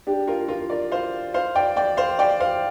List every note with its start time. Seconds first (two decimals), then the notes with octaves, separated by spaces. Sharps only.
0.07 D4 G4
0.27 F4 A#4
0.48 F4 A#4
0.70 A#4 D5
0.92 C5 F5
1.34 C5 F5
1.55 D5 G5
1.76 D5 G5
1.97 C5 F5
2.19 D5 G5
2.40 C5 F5